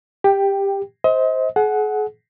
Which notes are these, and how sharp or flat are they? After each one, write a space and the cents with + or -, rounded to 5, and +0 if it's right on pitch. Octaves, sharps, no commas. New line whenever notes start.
G4 +15 G5 +0
C5 +0 D#5 +35
G#4 +40 F#5 +0